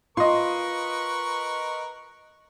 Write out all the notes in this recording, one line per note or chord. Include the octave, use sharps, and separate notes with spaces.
F4 A#4 B4 D#5 C6 C#6